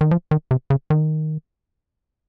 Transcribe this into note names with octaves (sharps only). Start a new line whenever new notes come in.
D#3
F3
D#3
C3
C#3
D#3